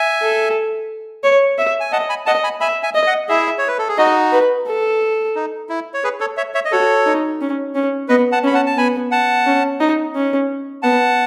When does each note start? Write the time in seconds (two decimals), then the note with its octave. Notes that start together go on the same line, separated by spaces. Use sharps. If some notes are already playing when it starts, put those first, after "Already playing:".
Already playing: E5 G#5
0.22 A4
1.24 C#5
1.58 E5
1.80 G#5
1.92 D#5 F#5 A5
2.09 G#5 B5
2.26 D#5 F#5 A5
2.44 G#5 B5
2.60 E5 G#5 B5
2.83 E5 G#5
2.95 D#5
3.07 D#5 F#5
3.29 E4 G#4 E5
3.58 C#5
3.68 B4
3.78 A4
3.88 G#4
3.98 D#4 F#4 D#5
4.32 B4
4.66 A4
5.35 D#4
5.69 E4
5.94 C#5
6.04 G#4 B4
6.20 A4 C#5
6.37 C#5 E5
6.54 C#5 E5
6.65 D#5
6.71 F#4 A4 C#5
7.06 D#4
7.41 C#4
7.75 C#4
8.08 B3 B4 D#5
8.32 F#5 A5
8.43 C#4 B5
8.54 F#5 A5
8.66 A5
8.77 B3 G#5 B5
9.11 F#5 A5
9.46 C#4
9.80 D#4
10.15 C#4
10.83 B3 F#5 A5